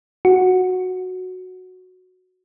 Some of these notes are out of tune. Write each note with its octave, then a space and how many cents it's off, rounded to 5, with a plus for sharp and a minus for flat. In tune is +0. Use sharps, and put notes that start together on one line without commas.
F#4 -5